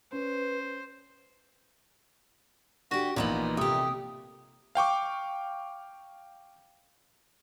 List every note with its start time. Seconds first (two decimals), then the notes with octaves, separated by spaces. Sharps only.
0.13 C#4 B4 C5
2.91 D3 F#4 G4
3.16 A#1 A#2 E3 B3 D#4 B5 F#7
3.57 C3 A3 G4 D#6
4.75 F5 G5 C#6 D6